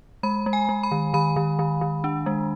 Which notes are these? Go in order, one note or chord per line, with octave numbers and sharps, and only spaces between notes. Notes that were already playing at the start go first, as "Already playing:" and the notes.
G#3 B5
G#3
G#5
G#3
B5
D#3
D#3 B5
D#3
D#3
D#3
D4
G#3